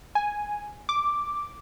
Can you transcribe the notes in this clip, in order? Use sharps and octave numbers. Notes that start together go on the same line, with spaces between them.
G#5
D6